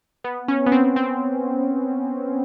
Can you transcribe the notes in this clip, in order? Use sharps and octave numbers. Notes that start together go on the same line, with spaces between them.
B3
C#4
B3
C4
C4